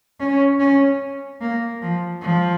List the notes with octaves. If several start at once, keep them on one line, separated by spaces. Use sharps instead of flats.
C#4
C#4
A#3
F3
F3